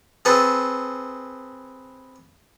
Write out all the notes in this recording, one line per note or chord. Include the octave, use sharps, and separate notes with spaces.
C4 G#4 A4 B4